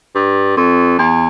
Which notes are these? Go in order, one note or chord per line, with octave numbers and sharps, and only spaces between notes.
G2
F2
E2